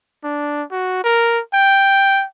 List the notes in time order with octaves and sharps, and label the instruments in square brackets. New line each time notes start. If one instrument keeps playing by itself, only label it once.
[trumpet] D4
F#4
A#4
G5